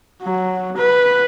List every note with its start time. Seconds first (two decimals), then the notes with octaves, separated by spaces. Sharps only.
0.23 F#3
0.77 B4